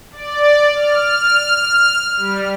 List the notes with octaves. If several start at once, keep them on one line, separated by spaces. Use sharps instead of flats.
D5
F6
G3